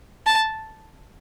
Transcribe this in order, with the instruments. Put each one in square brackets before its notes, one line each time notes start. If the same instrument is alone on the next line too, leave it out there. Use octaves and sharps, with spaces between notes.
[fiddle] A5